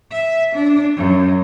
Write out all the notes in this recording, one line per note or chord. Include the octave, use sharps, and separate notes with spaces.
E5
D4
F#2